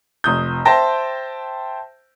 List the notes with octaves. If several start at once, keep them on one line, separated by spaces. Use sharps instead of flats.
F1 D#6 G6
C5 E5 G5 A5 A#6